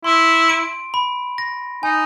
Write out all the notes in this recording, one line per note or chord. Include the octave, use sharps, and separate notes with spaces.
E4 C6
D7
B5
A#6
D#4 G#5